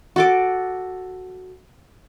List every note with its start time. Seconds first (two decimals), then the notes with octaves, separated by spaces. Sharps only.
0.16 F#4 A4 D6